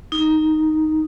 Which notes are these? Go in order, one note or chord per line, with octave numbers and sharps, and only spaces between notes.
D#4